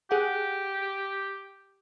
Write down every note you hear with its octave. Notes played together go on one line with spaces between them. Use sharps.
G4 G#4 F#5